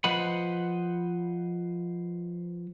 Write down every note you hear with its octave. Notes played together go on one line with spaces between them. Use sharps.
F3 B4 C5 D#5 F#5 B5